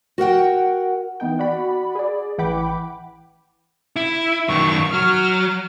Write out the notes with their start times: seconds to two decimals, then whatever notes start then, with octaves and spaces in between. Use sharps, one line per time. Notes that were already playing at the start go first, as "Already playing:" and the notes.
0.18 F#4 A#4 F#5 G5
1.20 E3 B3 D#4 G5
1.39 F#4 D5 F#5 B5
1.95 G#4 D5
2.38 A1 E3 F#5 G5 B5 D6
3.96 E4
4.49 F#2 D#3 C#6
4.93 F#3 F6